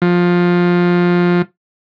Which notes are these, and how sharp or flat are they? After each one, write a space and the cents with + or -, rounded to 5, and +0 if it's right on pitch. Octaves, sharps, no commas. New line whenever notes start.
F3 +15